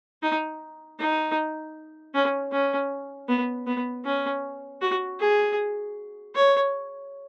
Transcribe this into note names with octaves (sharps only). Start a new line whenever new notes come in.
D#4
D#4
C#4
C#4
B3
B3
C#4
F#4
G#4
C#5